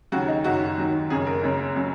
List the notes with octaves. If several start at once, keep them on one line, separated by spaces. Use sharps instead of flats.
D#2 C#3 F#3 F#4
D#4
F#1 F#2 D#3 F#3 F#4
D#2 D#3 F#3
F#1 F#2 C#3 G#4
A#4
F#1 F#2 C#3
C#3 F#3